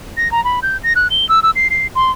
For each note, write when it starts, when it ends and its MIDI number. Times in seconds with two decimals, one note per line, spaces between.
0.17 0.31 94
0.32 0.43 82
0.45 0.60 83
0.63 0.77 91
0.83 0.93 94
0.96 1.08 90
1.10 1.28 103
1.29 1.40 88
1.43 1.51 88
1.56 1.68 96
1.70 1.87 96
1.95 2.11 84